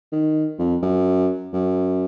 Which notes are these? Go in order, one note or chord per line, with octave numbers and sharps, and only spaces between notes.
D#3
F2
F#2
F#2